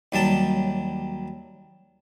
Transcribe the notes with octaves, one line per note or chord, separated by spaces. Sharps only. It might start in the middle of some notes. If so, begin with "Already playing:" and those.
D#2 F#3 G3 A5